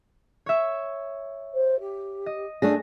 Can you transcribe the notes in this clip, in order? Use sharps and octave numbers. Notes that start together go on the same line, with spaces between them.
C#5 E5
C5
G4
D#5
A3 D4 G#4 A#6